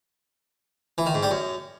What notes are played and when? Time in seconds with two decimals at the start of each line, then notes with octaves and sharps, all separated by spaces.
0.98 E3
1.06 D#3
1.14 G#2
1.23 G3
1.31 F#2